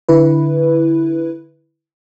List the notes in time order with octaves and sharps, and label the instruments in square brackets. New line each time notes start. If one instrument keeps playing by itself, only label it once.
[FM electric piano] D3 E4 B4